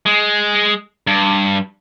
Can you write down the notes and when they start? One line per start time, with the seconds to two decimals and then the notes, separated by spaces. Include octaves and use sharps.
0.06 G#3
1.07 G2